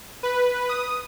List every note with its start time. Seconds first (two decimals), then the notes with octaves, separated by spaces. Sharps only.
0.23 B4
0.69 D#6